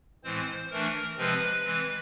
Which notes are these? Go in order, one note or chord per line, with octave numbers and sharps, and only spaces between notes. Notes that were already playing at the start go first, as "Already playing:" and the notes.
A2 E3 G#3 C4 C5
E3 A3 D4 A#4
C3 F3 G#3 C4 B4
E3 G#3 C4